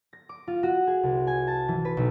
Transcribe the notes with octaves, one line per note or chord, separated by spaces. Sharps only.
A#6
D6
F4
F#4
G#4
C2
G#5
A5
E3
B4
B1